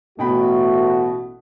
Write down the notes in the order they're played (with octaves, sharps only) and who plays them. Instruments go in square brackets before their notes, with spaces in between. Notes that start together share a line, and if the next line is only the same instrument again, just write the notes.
[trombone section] A1 A3 F#4 [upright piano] B2 G5 B5